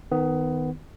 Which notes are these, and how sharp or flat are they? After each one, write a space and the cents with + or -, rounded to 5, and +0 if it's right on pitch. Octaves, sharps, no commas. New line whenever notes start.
D#3 +0 B3 +20